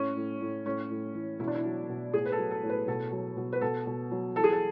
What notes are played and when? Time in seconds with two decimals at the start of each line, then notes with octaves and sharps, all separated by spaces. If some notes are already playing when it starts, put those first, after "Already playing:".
Already playing: A2 C#4
0.16 A2
0.41 A2
0.66 A2 C#4
0.90 A2
1.15 E3
1.40 B2 E4
1.47 D4
1.55 E4
1.64 F#3
1.89 B2
2.14 A2 G#4
2.25 B4
2.32 A4
2.38 F#3
2.51 A4
2.63 A2
2.69 B4
2.87 B2 A4
3.12 F#3
3.37 B2
3.53 B4
3.61 B2 A4
3.87 B2
4.11 F#3
4.36 E3 A4
4.44 G#4
4.52 A4